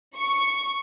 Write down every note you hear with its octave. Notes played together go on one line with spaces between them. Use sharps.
C#6